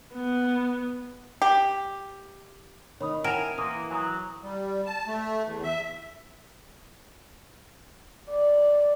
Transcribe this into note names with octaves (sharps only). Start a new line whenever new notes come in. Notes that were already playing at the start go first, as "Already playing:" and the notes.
B3
G4
D#3 D#4 C#5 B5 D#6
C4 E4 A#4 F#5 G#5 E7 F7
E3 A#3 C6 D#6 D#7
F#3 G#5 A#5 D#6
G3
A5
A3
E2
E5
D5